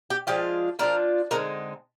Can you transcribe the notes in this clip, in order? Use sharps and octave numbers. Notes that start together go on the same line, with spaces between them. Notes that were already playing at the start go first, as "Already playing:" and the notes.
G4
F3 G#3 D4 F4 G4
F3 G#3 D4 F4 A#4
D3 G#3 C4 D#4 A#4